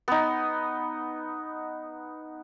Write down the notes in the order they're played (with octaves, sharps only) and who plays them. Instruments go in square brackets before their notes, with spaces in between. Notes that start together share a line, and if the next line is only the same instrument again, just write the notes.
[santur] B3 D#4